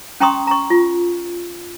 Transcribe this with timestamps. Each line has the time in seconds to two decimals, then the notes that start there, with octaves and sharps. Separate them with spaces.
0.20 C#4 G5 A#5 C6 C#6 D#6
0.47 A#5 C#6
0.70 F4